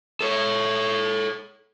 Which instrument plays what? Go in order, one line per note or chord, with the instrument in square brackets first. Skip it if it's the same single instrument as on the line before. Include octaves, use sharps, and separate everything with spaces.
[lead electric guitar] A4 C#5